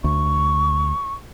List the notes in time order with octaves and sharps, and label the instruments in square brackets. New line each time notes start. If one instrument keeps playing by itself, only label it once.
[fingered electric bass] D2 [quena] C#6